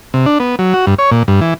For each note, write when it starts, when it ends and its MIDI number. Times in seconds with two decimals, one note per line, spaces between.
0.14 0.26 48
0.26 0.38 62
0.40 0.56 59
0.59 0.73 54
0.74 0.86 66
0.87 0.94 43
0.99 1.10 73
1.11 1.23 46
1.28 1.40 43
1.41 1.54 52